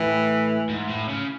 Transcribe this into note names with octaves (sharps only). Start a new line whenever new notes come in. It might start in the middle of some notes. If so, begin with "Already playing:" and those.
Already playing: A2 E3
G#2
A2
C#3